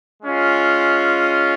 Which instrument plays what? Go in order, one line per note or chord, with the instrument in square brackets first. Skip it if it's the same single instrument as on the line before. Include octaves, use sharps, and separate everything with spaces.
[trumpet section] G#3 C#4 F4